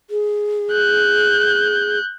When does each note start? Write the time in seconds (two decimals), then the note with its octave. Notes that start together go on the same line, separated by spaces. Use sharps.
0.10 G#4
0.72 F#6 G6